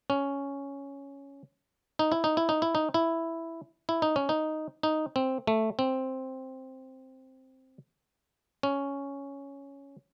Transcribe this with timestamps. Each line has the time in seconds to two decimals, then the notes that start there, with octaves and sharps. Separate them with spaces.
0.10 C#4
1.99 D#4
2.12 E4
2.24 D#4
2.37 E4
2.49 D#4
2.62 E4
2.75 D#4
2.94 E4
3.89 E4
4.02 D#4
4.16 C#4
4.29 D#4
4.83 D#4
5.16 C4
5.47 A3
5.79 C4
8.63 C#4